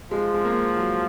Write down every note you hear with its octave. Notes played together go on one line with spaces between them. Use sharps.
F3 G#3
G#3
A#3
F#3